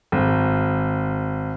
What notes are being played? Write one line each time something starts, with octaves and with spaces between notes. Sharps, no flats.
G#1